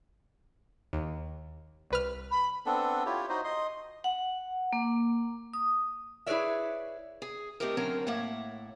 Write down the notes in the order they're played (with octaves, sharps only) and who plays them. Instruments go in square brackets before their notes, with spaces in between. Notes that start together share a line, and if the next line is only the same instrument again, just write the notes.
[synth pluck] D#2
C2 B4 F6
[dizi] B5
[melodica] B3 C4 D4 A4
E4 F4 G4 C#5
D#4 F#4 C5 D#5
D#5 C6
[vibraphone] F#5
A#3
D#6
[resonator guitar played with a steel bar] E4 G#4 B4 C#5 D5 E5
[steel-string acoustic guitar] G#4
A3 C4 D#4 E4 G4 A#4
D3 F#3 C4 C#4 A#4 C#5
A2 A#3 C#5 E5 F#5